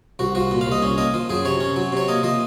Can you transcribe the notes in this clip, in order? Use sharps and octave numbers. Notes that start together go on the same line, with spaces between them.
C2 F#4
F3 F#4
A#2
F5
C2
D#5
C#4
A#3 D#5
F3
F#2 G#4
C3 C#5
C#4
F#3
C3 C#5
A#3 D#5
F3 D#5